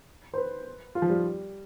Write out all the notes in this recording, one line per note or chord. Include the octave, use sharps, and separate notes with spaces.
C5
B4
F4
F3
G3